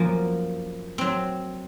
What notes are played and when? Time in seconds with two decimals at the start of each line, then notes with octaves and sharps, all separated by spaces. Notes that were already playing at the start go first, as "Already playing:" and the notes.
Already playing: F#2 F3 A#3
0.98 F#3 C4